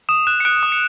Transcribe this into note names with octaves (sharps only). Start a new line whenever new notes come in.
D#6 E7
F#6 E7
C#7
F#6 D7
D#6
C#7